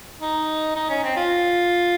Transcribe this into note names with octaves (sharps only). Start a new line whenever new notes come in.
D#4
D#4
C#4
C4
F4